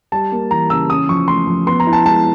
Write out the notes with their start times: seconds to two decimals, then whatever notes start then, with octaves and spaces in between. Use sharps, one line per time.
0.12 G3 A5
0.32 A#3
0.51 E3 A#5
0.70 C#3 E6
0.90 C#4 D#6
1.09 F3 C#6
1.28 A3 C6
1.47 F3
1.67 B3 C6
1.80 A#5
1.87 E4
1.93 A5
2.06 G#3 A5